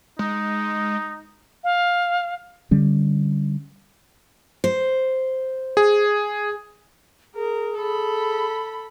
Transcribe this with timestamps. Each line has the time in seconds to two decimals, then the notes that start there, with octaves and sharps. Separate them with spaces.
0.19 G#3 D#4
1.64 F5
2.71 D3 G3 C#4
4.64 C5
5.77 G#4
7.35 G#4 A#4
7.78 A4 B5